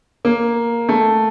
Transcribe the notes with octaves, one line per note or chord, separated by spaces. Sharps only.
A#3
A3